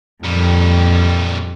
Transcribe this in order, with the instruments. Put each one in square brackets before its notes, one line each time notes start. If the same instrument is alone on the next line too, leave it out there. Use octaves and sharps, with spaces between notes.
[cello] F2 [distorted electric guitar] A#2 G3